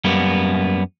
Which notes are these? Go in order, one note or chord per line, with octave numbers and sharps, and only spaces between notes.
F#2 G3 A#3 B3